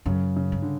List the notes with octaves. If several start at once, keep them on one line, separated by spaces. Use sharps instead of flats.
F#2 C#3
C#3
G2
D3